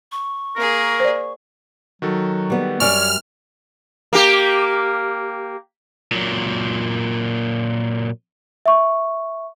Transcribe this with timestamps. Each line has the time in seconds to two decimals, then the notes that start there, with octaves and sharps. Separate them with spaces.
0.12 C#6
0.56 A#3 G#4 A#4
1.00 C5 D5
2.02 D#3 F#3 F#4 A4
2.50 G3 B3
2.80 F#2 G3 C#4 D5 G#5 C#6 F6
4.13 A#3 G4
6.12 A#2 F#3
8.66 E5 C#6